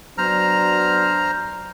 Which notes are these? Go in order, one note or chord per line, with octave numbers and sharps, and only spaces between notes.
F#3 B3 D4 C5 A#5 F6